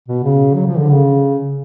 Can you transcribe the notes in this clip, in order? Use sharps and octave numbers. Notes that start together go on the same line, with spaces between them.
B2
C#3
F#3
F3
D3
C#3